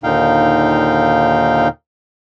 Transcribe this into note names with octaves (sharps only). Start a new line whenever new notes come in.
D#2 A#2 D3 D#4 F5 G5